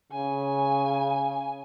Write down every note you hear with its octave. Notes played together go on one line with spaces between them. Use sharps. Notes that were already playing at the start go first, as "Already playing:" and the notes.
C#3 G#5